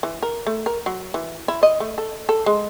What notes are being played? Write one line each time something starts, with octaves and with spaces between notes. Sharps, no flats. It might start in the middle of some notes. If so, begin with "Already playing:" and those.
E3
A#4
A3
A#4
F#3
E3
E4
D#5
A3
A4
A4
G#3